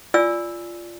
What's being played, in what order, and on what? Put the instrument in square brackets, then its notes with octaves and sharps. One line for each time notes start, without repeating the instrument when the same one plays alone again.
[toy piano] F4 D5 G#5 E6